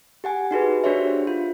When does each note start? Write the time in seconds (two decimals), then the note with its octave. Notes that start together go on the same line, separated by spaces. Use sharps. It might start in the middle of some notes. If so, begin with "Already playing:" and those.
0.24 G4 F#5 G#5
0.51 D#4 F#4 G#4 B4
0.84 D4 F#4 G4 C5 C#5 E5
1.27 F4